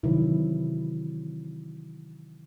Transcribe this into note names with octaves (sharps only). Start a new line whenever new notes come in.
C3 D#3 E3 F#3 E4